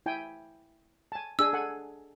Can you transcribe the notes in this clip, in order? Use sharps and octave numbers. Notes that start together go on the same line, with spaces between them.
E4 G5 G#5
G#5 A5
D4 G#4 G#5 E6
A4 F#5 G#5